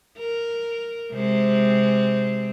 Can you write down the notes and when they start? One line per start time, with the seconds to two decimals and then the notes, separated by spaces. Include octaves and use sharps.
0.18 A#4
1.12 C3 G#3 C4